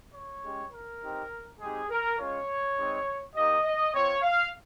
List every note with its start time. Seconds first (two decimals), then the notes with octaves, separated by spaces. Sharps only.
0.14 C#5
0.43 G#3 C#4 G4
0.72 A#4
1.01 C4 D#4 G4
1.59 G#3 C4 D#4 G4 G#4
1.89 A#4
2.18 G#3 C#4 F4 C#5
2.77 G#3 C4 D#4
3.35 A#3 D#4 G4 D#5
3.64 D#5
3.93 C4 F4 C#5
4.22 F5